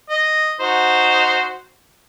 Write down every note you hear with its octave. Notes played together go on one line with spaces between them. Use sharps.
D#5
D#4 F#4 C5